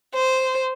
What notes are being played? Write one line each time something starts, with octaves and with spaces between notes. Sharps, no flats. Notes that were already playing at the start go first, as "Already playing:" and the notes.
C5